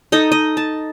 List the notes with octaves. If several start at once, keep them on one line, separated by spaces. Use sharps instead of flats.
D#4 A4 D#5
D#5
A5